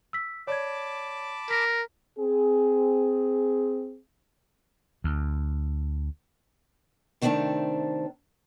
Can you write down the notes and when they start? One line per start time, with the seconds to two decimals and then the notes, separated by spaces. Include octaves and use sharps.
0.13 E6 B6
0.47 C#5 D5 A5 B5 D6 G#6
1.50 A#4 B6
2.19 C4 G#4
5.04 D2
7.22 C3 D#3 A3 C4 D4 A5